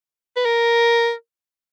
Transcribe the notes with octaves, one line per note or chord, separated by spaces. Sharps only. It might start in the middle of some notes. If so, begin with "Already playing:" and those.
B4
A#4